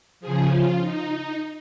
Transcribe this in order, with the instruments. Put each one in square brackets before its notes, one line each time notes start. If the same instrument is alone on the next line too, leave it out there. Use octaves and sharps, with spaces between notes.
[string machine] C#3 F3 G#4
F4
D#4